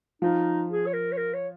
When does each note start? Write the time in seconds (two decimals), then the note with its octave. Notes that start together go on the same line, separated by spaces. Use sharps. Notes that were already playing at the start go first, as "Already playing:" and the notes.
0.22 F3 D#4 F4
0.70 G#4
0.87 C#5
0.93 A#4
1.12 C#5
1.17 A#4
1.34 C#5